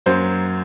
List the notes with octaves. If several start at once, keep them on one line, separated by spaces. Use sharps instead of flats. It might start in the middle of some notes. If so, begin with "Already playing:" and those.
F#2 F#3 A#3 C5